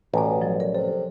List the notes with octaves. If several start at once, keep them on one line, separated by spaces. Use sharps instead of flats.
A1 B2 D5 G#5 A#5
F3 F#3
A#4 D5
C3 A4